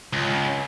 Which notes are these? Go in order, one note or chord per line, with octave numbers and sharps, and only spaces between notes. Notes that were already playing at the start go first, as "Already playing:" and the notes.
C#2